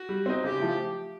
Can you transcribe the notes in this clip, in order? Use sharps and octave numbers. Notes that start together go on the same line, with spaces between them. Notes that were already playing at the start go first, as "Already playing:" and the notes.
Already playing: F#4
G3
C4 D#4
C#3 G4
F3 A3